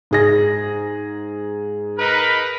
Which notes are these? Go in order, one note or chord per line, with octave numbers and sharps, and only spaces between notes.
G#2 G#4 A#6
D#4 A#4 B4